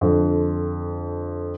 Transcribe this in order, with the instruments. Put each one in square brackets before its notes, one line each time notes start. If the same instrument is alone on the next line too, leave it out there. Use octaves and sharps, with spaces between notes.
[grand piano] F2 D3 F3